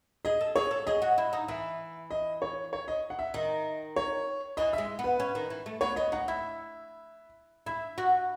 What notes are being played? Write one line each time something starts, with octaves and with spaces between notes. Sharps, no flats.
G#4 D#5
A4
G#4 C#5
A4
G#4 D#5
F#4
E4
D#4
E3 E5
D#5
C#5
C#5
D#5
F#5
E5
D#3 D#5
C#5
E3 D#5
G#3 E5
B3
B4
C#4
D#3
E3
A3
B3 C#5
B3 D#5
D#4 F#5
E4 E5
E4 E5
F#4